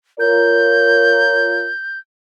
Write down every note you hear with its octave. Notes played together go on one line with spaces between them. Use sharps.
F4 A#4 C#5 G6